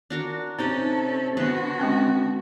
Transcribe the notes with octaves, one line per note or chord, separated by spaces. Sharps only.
D4 F#4 A#4
C3 C#4 D#4 G4 A4 D#5
D3 B3 F#4 G#4 B4
G#3 C4 C#4